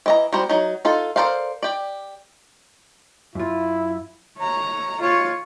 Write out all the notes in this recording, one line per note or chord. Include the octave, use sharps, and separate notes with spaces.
E3 D#5 A#5
G3 C4 F#4 C5 A#5
F#3 D#4
D#4 F4 A4
A4 A#4 C5 D5 F5
G4 D5
F#2 E4 F4
C#5 A#5
F4 C#5